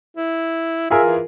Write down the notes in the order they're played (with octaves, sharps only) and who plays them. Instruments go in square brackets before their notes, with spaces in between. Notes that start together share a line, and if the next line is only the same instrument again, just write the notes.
[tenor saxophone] E4
[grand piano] F4 G#4 A#4 [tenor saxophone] E5
[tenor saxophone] E3